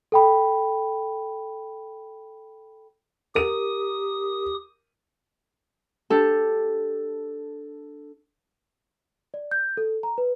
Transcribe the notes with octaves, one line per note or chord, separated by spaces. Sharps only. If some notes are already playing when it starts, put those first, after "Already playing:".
A4 G5 B5
G4 A#4 D#6 D#7
D4 G4 A4
D5
G6
A4
A#5
B4